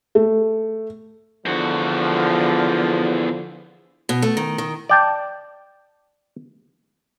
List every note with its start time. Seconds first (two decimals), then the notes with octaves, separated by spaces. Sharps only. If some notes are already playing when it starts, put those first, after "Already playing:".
0.15 A3
1.46 E2 D3 F3 F#4
4.09 B2
4.22 A3
4.37 D#3
4.58 D#3
4.89 D5 G5 A5